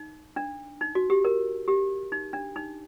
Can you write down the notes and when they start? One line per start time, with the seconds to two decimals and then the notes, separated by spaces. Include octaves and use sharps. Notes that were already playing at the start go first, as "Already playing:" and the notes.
Already playing: D#4
0.36 D4
0.81 D#4
0.95 F#4
1.10 G4
1.25 A#4
1.68 G4
2.12 D#4
2.33 D4
2.56 D#4